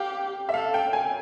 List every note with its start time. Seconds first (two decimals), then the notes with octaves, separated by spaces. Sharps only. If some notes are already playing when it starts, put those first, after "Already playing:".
Already playing: G4 F5
0.49 E5
0.54 A4 F5
0.74 G5
0.87 G5
0.93 G#5